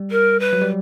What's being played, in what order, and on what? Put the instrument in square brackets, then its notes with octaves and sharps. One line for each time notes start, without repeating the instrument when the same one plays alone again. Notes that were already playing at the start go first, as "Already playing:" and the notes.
Already playing: [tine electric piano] G3
[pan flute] A#4
B4
[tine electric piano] F#3
G3